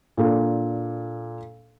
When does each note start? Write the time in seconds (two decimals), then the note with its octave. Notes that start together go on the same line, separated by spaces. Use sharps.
0.17 A#2 D4 A4